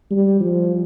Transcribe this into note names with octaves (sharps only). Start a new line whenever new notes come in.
G3
F3